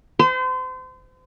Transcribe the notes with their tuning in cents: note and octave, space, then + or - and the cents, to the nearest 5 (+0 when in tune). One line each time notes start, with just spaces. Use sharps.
C5 -35